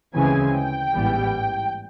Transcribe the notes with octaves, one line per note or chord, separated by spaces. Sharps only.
D2 C#3 E3 G#3 C4 G#5
G5
A1 G#2 E3 G3 B3